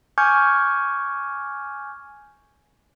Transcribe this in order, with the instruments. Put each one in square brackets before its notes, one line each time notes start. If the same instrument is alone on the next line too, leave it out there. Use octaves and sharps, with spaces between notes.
[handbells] G#5 C#6 D6 F6 G6 G#6